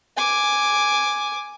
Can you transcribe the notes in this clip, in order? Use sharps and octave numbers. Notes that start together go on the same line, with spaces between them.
G#5 D6